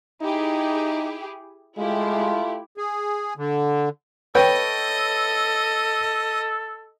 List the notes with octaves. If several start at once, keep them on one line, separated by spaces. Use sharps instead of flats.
D#4 E4 G4 G#4
G#3 A3 E4 F4 G4
G#4
D3
A4 B4 C#5 D#5 G5